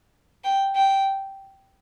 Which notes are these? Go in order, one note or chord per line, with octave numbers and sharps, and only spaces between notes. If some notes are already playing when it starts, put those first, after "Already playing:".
G5
G5